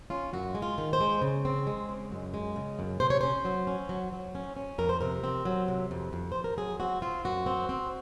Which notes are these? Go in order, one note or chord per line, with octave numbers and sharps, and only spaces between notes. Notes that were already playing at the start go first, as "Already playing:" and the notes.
C#4 F4
F#2 F#4
G#3
F4
D#3
C5
G#3
C#3
C4
G#3
C#3
F#2
G#3
C#3
F#2
C3 C5
C#5
C#4 C5
F#3
C#4
F#3
F#3
C#4
C#4
F2 A#4
C5
C3 A#4
C4
F#3
C3
F2
F2
F2 C5
A#4
F#3 G#4
C4 F#4
C4 F4
F#2 F#4
C4
C4